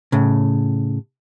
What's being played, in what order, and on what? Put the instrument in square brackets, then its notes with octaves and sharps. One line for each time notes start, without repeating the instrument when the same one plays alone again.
[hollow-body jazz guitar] A2 C#3